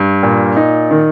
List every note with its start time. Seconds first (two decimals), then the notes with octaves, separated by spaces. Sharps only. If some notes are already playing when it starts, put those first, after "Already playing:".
Already playing: G2
0.23 A#2
0.57 D#4
0.91 D#3